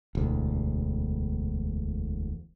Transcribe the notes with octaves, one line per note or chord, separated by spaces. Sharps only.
E1 D2